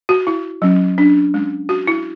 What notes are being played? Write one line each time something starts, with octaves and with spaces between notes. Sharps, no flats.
F#4
E4
F#3 C#4
D4
G#3 C#4
F#4
E4